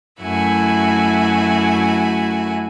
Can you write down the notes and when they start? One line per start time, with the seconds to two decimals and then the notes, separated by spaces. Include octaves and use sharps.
0.21 F#2 A3 E4 F#4 G#5